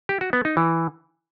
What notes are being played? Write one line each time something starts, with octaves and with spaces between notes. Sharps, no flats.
G4
F#4
B3
D#4
E3